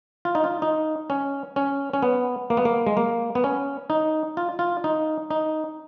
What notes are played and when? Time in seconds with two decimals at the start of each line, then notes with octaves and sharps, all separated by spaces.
0.25 F4
0.35 D#4
0.44 F4
0.62 D#4
1.10 C#4
1.56 C#4
1.93 C#4
2.02 B3
2.50 A#3
2.57 B3
2.65 A#3
2.87 G#3
2.97 A#3
3.35 B3
3.44 C#4
3.90 D#4
4.37 F4
4.59 F4
4.84 D#4
5.30 D#4